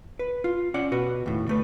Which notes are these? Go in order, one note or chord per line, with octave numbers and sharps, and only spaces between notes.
B4
F4
C#4 D5 F#5
B2 F#4 B4
D#2 A2
D3 A3 B4